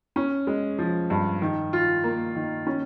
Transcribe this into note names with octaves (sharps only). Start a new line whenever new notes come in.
C#4
G#3
F3
G2
D#3
F4
A#3
D#3
C#4